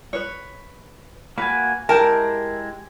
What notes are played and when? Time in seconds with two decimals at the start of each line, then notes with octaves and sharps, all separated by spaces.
0.13 B4 C#5
1.38 A#3 F#4 B4 G#5
1.89 G#3 E4 G4 A#4 G5 A5